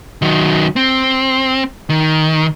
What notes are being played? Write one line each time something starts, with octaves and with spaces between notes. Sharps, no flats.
D#3 F#3
C4
D#3